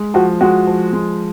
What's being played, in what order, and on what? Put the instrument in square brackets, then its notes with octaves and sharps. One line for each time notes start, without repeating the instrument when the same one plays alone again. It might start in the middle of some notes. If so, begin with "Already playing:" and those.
Already playing: [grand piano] G#3
[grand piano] F3 [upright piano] F#4
[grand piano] G#3 [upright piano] F#4
[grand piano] F3
G#3